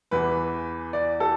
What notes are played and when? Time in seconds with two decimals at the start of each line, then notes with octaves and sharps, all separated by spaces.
0.11 E2 E3 B4
0.93 D5
1.20 A4